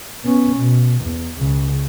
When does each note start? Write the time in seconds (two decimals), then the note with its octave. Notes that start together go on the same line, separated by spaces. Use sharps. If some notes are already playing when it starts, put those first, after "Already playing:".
0.25 B3 C#4
0.56 B2
1.01 E2
1.38 C#2 C#3